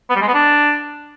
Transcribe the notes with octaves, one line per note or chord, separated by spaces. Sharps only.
B3
G3
G#3
B3
D4